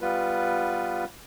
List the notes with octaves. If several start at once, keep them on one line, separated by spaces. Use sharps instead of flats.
G3 B3 F4 B4